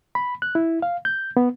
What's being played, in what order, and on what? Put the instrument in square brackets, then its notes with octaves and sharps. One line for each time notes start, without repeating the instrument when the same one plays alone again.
[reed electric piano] B5
F#6
E4
F5
G6
B3